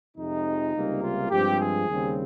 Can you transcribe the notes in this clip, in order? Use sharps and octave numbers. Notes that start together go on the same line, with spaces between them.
F2 C3 F3 G#3 D#4
C#2 C3 G3 A#3
F4
G2 F3 G#3 C4 G4
G#4
D#2 C#3 G3 C4